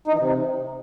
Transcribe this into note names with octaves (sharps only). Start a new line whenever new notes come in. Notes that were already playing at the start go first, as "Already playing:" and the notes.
D#4
E3
C3